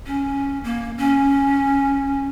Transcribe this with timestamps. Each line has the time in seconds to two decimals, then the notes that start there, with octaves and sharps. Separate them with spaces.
0.06 C#4
0.64 A#3
0.98 C#4